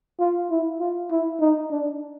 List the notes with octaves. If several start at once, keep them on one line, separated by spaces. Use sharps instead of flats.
F4
E4
F4
E4
D#4
D4